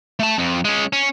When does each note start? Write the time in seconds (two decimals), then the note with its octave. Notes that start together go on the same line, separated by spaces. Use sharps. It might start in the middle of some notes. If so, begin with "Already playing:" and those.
0.19 A3 A5
0.38 F2
0.65 G#3 C#4
0.93 C#4